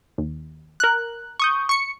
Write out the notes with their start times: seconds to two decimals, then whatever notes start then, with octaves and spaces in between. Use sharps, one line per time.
0.18 D#2
0.80 A#4 F#6
1.40 C#6 D#6 G6
1.69 C#6 C#7